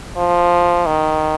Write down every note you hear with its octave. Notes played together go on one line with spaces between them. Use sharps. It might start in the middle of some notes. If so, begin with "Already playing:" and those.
F3
D#3